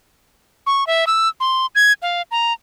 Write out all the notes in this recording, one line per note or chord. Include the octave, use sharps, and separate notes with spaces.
C#6
E5
E6
C6
G#6
F5
A#5